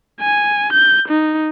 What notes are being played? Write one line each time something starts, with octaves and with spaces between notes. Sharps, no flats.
G#5
G6
D#4